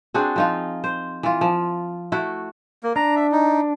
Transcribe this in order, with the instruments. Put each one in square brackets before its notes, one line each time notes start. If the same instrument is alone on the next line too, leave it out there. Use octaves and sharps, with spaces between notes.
[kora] C4 D4 F#4 G#4
F3 D#4 F4
C5
E3 F4
F3
A3 E4 F#4
[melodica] A#3
[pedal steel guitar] D4 [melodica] A#5
[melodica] E5
D#4